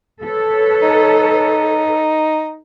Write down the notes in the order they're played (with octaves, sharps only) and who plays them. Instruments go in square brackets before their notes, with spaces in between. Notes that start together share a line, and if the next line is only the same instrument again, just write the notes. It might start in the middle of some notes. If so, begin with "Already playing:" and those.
[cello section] A4 B4 C#5
[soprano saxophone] D#4